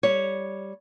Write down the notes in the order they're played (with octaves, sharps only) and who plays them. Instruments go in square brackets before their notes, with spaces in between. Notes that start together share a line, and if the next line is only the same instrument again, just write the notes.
[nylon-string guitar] G3 C#5